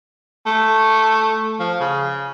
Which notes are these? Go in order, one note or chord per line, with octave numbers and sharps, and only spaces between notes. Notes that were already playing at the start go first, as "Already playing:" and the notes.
A3
F3
C#3